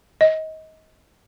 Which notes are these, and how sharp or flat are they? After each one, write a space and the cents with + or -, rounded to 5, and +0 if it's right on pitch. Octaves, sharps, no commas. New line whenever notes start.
D#5 +25